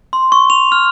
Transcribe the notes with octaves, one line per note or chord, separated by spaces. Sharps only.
C6
C#6
F7
F6